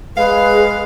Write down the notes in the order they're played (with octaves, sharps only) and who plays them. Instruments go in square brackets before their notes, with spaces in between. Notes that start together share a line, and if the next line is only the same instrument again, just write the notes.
[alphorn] G#3 [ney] G#4 [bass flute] B4 [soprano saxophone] F5